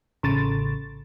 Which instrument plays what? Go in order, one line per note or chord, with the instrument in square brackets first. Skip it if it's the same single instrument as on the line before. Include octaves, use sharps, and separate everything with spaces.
[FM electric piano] A1 C#3 A6